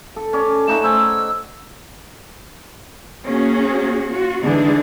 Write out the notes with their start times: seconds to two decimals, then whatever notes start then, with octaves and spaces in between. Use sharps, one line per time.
0.16 A4
0.33 C#4 D5
0.68 A3 D#4 F#5 E7
0.84 C5 G#5 E6
3.24 A#3 C#4 F#4 G#4
4.10 F4 F#4
4.44 D3 E3 G#3 D4 D#4 G#4